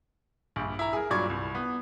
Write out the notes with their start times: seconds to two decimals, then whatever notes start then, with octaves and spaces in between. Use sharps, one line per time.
0.56 A#1 G2
0.79 E4 A#5
0.93 G#4 A#4
1.10 G2 A#2 F#3 D5 C#6 G#6
1.30 C2
1.55 B3